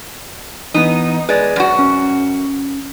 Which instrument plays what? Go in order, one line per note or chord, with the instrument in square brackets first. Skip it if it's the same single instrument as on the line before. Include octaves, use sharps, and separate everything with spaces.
[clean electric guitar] E3 B3 [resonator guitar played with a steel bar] D#4
[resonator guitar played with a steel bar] G#3 [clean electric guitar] B4 D5
[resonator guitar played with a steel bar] F#2 F#4
[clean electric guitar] C#4